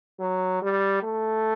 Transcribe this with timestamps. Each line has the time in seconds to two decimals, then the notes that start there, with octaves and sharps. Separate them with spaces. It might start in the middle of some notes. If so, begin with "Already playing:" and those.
0.20 F#3
0.62 G3
1.03 A3